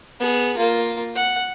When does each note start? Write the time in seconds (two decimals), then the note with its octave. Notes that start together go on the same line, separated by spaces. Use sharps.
0.20 B3 G#4
0.56 A#3 F4
1.15 F#5